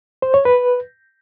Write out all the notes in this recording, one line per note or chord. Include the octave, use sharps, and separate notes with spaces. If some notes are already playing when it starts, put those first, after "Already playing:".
C5
C#5
B4